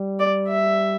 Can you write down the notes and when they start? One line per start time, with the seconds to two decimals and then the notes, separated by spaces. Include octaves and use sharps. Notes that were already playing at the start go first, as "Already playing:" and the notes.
Already playing: G3
0.19 D5
0.48 E5